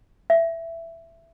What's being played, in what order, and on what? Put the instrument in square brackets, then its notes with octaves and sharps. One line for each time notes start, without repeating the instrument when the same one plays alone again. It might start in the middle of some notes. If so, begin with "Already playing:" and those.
[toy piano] E5